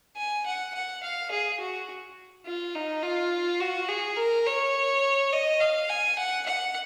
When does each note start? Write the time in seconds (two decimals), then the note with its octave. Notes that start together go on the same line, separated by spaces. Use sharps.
0.17 G#5
0.46 F#5
0.74 F#5
1.03 F5
1.31 G#4
1.60 F#4
2.46 F4
2.75 D#4
3.02 F4
3.60 F#4
3.88 G#4
4.17 A#4
4.46 C#5
5.32 D#5
5.60 F5
5.89 G#5
6.17 F#5
6.46 F#5